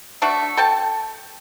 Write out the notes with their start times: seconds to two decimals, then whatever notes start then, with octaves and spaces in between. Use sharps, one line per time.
0.22 A3 D4 F#4
0.57 A4 G5 A5